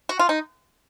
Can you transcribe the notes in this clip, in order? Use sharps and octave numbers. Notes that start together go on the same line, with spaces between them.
F#4
F4
D#4